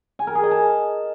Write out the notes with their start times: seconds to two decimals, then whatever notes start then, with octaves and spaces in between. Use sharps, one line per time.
0.19 G#5
0.27 A#4
0.35 G#4
0.43 D#5
0.51 A5